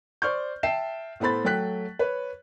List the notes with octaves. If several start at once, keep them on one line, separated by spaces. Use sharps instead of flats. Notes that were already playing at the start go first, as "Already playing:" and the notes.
C5 D5 C#6 F6 G6
E5 G5 A5 C7 E7
A2 B3 A4 C5 B5 A6
F#3 A3 G5 F#6 B6
B4 C#5